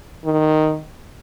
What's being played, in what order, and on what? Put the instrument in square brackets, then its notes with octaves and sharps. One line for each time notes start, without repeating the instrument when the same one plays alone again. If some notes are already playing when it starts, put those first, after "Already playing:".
[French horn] D#3